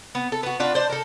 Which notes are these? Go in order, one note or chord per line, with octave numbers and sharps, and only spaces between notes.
B3
A4
B3 F#4
D4 F4 F#4 B4
D4 C5
A4 A#4